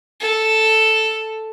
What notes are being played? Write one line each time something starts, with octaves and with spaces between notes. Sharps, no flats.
A4